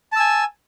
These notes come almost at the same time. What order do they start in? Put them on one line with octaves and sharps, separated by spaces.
A5 E6 G#5